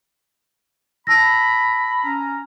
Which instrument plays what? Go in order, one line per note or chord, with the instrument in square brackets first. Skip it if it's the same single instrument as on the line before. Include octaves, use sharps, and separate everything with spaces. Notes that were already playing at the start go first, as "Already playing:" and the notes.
[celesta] A5 E6 A#6 [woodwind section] B5
[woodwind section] C#4 A#5